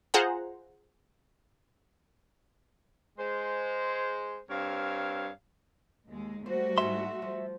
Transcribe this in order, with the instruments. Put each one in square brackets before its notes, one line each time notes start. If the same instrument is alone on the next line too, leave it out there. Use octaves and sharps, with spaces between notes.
[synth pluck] F4 G#4 C5 F#5 A#5
[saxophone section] G#3 C5
G2 C4 A#4 C#5 F5
[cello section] D#2 G#3
[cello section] G3 A3 F#4 [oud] C5
[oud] G#2 E4 B4 [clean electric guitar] E5 C6
[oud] F3